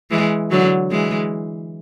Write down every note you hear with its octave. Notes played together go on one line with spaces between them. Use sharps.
E3 G#3
D3 F#3
E3 G#3